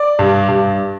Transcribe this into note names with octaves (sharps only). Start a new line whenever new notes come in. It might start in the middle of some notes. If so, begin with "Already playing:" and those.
Already playing: D5
G2
G2